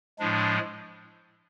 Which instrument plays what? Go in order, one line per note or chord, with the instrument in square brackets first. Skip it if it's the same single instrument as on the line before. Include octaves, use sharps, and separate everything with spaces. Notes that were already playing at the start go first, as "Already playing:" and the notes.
[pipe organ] A2 F3 G#3 D4